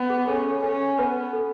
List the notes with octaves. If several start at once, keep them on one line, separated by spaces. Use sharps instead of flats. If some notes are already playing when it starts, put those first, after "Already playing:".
Already playing: B3
G#4
C#4 A4 C#5
A4 C#5
C#4 A4 C#5
B3 B4
A4